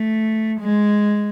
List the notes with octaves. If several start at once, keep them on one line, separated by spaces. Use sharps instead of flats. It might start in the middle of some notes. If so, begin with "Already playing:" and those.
Already playing: A3
G#3